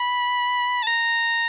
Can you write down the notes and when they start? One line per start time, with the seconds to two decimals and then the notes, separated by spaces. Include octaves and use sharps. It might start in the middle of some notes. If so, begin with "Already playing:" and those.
Already playing: B5
0.83 A5
0.87 A#5